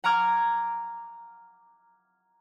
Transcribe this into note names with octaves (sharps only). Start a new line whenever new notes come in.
F#5 A#5 D6 F6 G#6